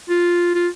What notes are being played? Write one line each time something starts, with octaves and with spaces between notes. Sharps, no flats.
F4
F4